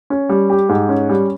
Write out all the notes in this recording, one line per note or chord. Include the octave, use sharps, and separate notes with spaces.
C#4
G3
G4
G#2
C#4
G3